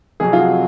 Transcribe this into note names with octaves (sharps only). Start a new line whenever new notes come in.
F1 F2 C3 F#3 G#4
F4
F#4